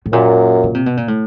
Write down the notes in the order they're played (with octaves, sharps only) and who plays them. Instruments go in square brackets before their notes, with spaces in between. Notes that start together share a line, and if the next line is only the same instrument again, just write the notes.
[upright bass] A2
[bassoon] F#2 [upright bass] A#2
[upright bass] C#3
C3
B2
A#2
A2